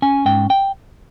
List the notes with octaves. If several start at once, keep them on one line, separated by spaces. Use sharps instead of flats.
C#4 G#5
G#2 G5
G5